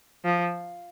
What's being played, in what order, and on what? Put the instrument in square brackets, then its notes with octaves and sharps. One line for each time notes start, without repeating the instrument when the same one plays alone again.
[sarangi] F3